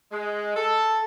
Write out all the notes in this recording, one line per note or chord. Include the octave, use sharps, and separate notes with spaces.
G#3
A4